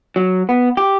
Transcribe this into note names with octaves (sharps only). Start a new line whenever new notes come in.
F#3
B3
G4